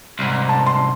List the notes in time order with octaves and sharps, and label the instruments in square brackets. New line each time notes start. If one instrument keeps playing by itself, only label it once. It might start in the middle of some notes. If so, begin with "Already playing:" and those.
[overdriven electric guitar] C2 G#2
[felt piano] A5
C6